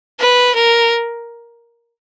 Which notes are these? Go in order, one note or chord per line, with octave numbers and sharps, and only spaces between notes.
B4
A#4